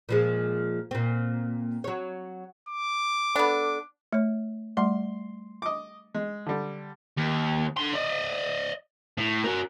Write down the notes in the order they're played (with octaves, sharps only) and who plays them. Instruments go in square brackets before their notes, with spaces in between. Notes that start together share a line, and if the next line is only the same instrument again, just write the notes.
[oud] A#2 F3 G#3
A#2 C4
F#3 C#5
[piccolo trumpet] D6
[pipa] B3 D4 [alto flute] A4
[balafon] A3 C#5
[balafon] G3 A3 F#5 [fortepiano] C6
[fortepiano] D#5 D6
G#3
D3 G3
[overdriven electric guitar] D#2
D3 C6
D5 D#5
A2
F#4 A#4